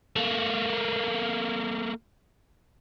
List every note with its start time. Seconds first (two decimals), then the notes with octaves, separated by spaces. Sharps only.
0.16 A3 A#3